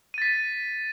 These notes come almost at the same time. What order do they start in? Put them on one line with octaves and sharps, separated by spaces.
D#7 A6 B6